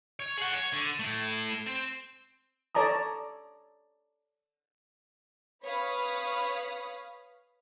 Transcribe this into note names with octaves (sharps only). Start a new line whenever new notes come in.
C#5
G#4 F#5
C#5
D3
A3 E4
C4
A4 C#5 D5 A5 A#5 D#6
B4 C#5 F5 B5 D#6 B6